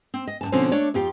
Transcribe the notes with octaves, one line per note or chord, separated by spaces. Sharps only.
C4
D#5
F#2 E3 A5
B2 D3 F3 C4 C#4
A3 D4 C#5 D5
F2 F4 G4